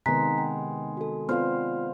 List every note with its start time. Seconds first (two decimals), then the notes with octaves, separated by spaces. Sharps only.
0.06 C3 D#3 G#3 B3 A#5 F#6 B6
0.38 G5
0.97 F#4 A4
1.29 B3 C4 F4 C5 D5 F5 F6